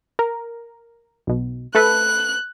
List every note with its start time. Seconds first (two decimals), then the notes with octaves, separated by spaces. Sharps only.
0.19 A#4
1.27 B1 B2
1.75 A3 A4 B4 F#6